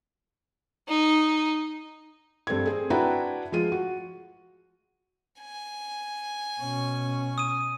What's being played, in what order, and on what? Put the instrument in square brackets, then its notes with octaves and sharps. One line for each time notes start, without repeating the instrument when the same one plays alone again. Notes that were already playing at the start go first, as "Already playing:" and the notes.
[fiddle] D#4
[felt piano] G2 C4 A4 G#6
C4 G#4
D4 E4 F#4 B4 G5 A#5
F3 G#3 F4 D#7
F#4
[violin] G#5
[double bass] B2 C#4
[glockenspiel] D#6 D#7